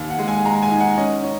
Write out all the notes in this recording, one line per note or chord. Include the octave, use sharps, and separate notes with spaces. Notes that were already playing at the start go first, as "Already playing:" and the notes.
Already playing: D#2
F#5
G#3
G#5
G#3 A#5
G#5
D#4
F#5
C#4 D#5
C#4